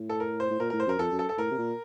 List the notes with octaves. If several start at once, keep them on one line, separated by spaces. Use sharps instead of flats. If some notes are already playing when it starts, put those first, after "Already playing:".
Already playing: A2
A4
A#4
C5
A2
A#2 A#4
A2 A#4
C5
F#2 A#4
F2 A4
F#2
A4
A4
A2 A#4
C3
A#2